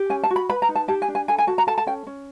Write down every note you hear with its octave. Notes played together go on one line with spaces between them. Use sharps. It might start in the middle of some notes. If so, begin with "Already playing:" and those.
Already playing: G4
C#4 G#5
A5
F#4
B5
B4 B5
A#5
D#4
A5
G4 A5
G#5
D4
G#5
A4 G#5
G#5
F#4 A5
A#5
A4 A5
A5
C#4 G5
C#4